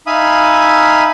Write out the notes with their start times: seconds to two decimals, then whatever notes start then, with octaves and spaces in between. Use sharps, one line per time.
0.07 D#4 E5 F5 G#5 B5 D#6